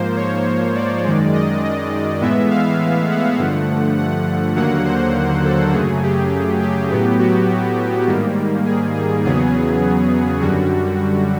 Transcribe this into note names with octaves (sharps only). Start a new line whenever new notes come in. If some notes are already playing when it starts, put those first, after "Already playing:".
Already playing: G#2 F3 A#3 C5
C#5
D5
F#2 D#3 G#3
D#5
D#5
A2 E3 G#3 B3 E5
F5
F#5
G2 D3 F3 A3
F#5
D#2 D3 F#3 A#3 F#5
C5
A4
F#2 C#3 F#3 A3 G#4
G4
G4
A2 F#3 B3
F#4
G#2 D#3 G3 A#3
G#4
G#4
E2 C#3 F#3 B3 G#4
F#2 D3 G3 F#4